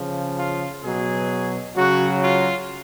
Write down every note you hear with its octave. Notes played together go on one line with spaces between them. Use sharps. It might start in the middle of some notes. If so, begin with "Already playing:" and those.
Already playing: C#3 F3
F4
B2 F#3 G#4
C#3 F#3 F#4
F4